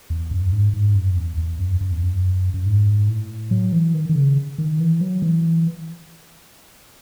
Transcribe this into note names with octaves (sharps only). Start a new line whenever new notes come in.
E2
F#2
G#2
G#2
F#2
E2
E2
F#2
F#2
E2
F#2
F#2
G#2
A2
F#3
E3
D#3
D#3
C#3
D#3
E3
F#3
E3